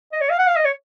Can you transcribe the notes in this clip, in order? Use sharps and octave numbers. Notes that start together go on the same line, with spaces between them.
D#5
C#5
F5
F#5
F5
D#5
C#5